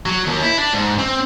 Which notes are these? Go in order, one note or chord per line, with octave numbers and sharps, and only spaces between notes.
F#3
D#2
E4
D4
G#2
C4